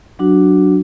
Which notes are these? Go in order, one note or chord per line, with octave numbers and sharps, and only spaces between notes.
F#3 D4 F#4